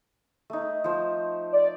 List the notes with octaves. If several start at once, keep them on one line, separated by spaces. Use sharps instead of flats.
A3 D#4
F3 C5
D5